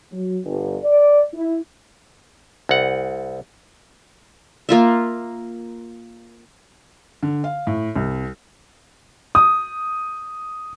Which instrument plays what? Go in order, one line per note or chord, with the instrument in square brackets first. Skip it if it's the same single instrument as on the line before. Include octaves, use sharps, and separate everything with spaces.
[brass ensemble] F#3
G1
D5
E4
[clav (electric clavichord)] C2 F#5
[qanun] A#3 F4 E5
[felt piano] D3
F5
A2
C2
[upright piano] D#6